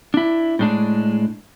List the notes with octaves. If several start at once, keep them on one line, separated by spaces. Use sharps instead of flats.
D4 E4
A2 G#3 D4